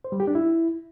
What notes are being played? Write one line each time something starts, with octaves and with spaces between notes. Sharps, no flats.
C5
G3
G4
D4
E4